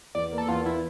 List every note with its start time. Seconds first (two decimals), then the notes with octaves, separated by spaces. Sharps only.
0.15 E2 D5
0.32 A#3
0.38 A4
0.48 E2 F4
0.66 E3 E4